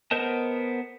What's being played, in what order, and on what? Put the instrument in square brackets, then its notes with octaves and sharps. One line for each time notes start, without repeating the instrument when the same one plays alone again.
[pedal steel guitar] B3 A#4 C5 D#5 A5